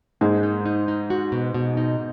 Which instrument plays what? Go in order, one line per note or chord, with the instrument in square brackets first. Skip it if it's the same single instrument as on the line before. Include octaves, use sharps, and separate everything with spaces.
[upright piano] G#2 G#3 [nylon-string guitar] A#3
[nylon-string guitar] D#4
D#4
D#4
F#4
B2
B2
D#4